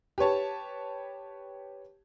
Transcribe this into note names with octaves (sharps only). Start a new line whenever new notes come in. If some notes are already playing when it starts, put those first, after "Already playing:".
G4 B4 C#5 A5